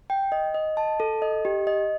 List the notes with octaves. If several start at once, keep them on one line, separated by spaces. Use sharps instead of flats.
G5
D#5
D#5
A5
A4
D#5
G4
D#5